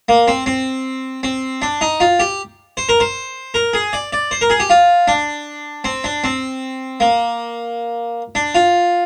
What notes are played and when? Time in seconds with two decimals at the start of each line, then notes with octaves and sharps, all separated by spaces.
0.09 A#3
0.28 C4
0.46 C4
1.23 C4
1.62 D4
1.81 D#4
2.00 F4
2.20 G4
2.77 C5
2.89 A#4
3.00 C5
3.54 A#4
3.73 G#4
3.93 D5
4.13 D5
4.31 C5
4.41 A#4
4.50 G#4
4.60 G4
4.70 F4
5.08 D4
5.84 C4
6.04 D4
6.24 C4
7.00 A#3
8.35 D4
8.55 F4